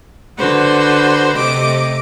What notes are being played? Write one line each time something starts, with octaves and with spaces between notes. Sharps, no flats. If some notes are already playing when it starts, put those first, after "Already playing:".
D3 F#4 B4 C5
C3 A3 D#5 D6